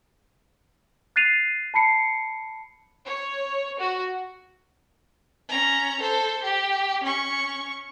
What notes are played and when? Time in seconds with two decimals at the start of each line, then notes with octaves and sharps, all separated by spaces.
1.16 F#6 A6 C7 D#7 F7
1.74 A5 B5 C7 C#7
3.07 C#5
3.81 F#4
5.49 C#4 A#5
6.01 A4 C5
6.44 G4
7.04 C#4 C#6